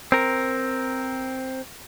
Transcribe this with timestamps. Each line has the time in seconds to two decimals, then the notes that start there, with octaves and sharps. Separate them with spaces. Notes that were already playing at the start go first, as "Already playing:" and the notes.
0.12 C4 A#4